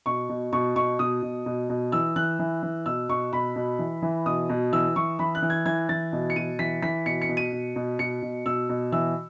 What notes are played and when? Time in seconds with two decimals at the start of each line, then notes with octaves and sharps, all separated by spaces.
0.06 B2 C#6
0.29 B2
0.53 B2 C#6
0.76 B2 C#6
0.99 B2 D#6
1.22 B2
1.46 B2
1.69 B2
1.92 E3 E6
2.16 E3 F#6
2.39 E3
2.63 E3
2.86 B2 E6
3.09 B2 C#6
3.33 B2 B5
3.56 B2
3.79 E3
4.02 E3
4.26 B2 D#6
4.49 B2
4.73 E3 E6
4.96 E3 C#6
5.19 E3 B5
5.35 F#6
5.42 E3
5.50 G#6
5.66 E3 G#6
5.89 E3 A6
6.13 B2
6.30 C#7
6.36 B2 D#7
6.59 E3 B6
6.82 E3 B6
7.06 B2 C#7
7.22 C#7
7.29 B2
7.37 D#7
7.52 B2
7.76 B2
7.99 B2 C#7
8.22 B2
8.46 B2 E6
8.69 B2
8.92 E3 E6